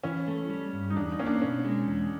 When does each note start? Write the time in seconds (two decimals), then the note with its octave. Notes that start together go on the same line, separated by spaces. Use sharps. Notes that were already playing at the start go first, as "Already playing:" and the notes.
0.04 E3 C#4
0.28 A3
0.49 G3
0.73 G2
0.90 D#4
0.96 E2 D4
1.12 D#4
1.19 A#3 C#4
1.26 D4
1.42 B2 C#4
1.65 G#3
1.87 E2